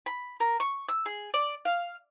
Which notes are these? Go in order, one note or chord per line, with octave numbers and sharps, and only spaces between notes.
B5
A#4
C#6
E6
G#4
D5
F5